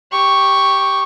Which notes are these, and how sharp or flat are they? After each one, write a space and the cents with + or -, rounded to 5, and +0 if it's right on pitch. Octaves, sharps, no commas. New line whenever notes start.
G4 +0 C#6 -5